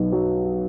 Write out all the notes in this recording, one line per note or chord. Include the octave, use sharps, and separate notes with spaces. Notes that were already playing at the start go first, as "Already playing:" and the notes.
Already playing: B1 B2
F#3